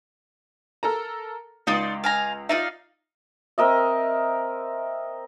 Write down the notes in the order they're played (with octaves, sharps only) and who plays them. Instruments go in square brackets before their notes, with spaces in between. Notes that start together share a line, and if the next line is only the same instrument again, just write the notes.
[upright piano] A4 A#4 A#5
[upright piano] C#2 [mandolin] D#4 F4 D5
[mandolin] F5 G#5 A#5
[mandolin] D#4 D5 F5 [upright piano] F4 E5
[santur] C4 A#4 D#5 E5